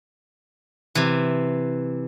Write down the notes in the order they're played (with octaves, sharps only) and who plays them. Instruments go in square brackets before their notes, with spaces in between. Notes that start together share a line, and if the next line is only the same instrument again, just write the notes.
[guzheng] C3 E3